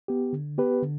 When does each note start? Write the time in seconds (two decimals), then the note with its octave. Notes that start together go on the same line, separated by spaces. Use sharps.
0.08 B3 G4
0.33 D3
0.58 B3 G4 B4
0.82 D3